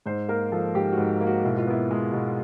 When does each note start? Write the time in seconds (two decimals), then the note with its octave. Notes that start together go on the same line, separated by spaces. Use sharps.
0.06 G#2 C5
0.29 A#3 A#4
0.52 F3 A4
0.74 G#2 G4
0.93 F#4
0.98 G#2
1.21 A#3
1.27 F#4
1.45 B2 E4
1.58 F4
1.67 B3 E4
1.91 G#3
2.13 B2